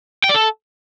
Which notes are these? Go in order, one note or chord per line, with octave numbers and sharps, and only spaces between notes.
G5
D5
A4